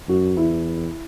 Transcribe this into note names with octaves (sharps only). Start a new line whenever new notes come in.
F#2 F#4
E2 E4